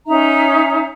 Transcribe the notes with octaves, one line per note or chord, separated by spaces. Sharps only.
C#4 D#4 E5 A#5